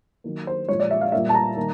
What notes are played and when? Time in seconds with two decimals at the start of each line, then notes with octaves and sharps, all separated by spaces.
0.24 D#3 F#3 A#3
0.47 C5
0.69 A#2 F3 G#3 C#5
0.80 D5
0.91 E5
1.01 F5
1.12 A#2 G3 A#3 E5
1.29 A5
1.34 A#5
1.56 D#3 G3 A#3